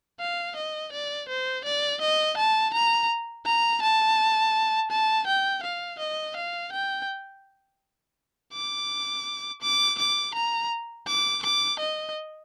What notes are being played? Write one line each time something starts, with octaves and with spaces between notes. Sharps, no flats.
F5
D#5
D5
C5
D5
D#5
A5
A#5
A#5
A5
A5
G5
F5
D#5
F5
G5
D6
D6
D6
A#5
D6
D6
D#5